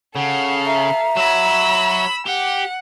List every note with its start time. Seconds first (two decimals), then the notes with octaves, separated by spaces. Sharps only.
0.15 C#3 A4 F5 F#5
0.66 E5 A#5
1.16 F#3 F#4 B5 E6
2.27 G4 F#5